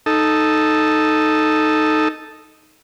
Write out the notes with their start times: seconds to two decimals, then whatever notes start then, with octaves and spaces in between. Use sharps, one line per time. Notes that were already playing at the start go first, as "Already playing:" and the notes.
0.06 D#4 A4